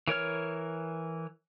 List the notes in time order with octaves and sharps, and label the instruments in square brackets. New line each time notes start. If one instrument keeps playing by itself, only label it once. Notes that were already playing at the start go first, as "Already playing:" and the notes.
[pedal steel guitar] E3 A#4 C#5 F6